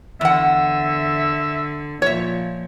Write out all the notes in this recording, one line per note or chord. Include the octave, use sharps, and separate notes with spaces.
E2 D3 E5 F#5
A#2 F3 C#5 E5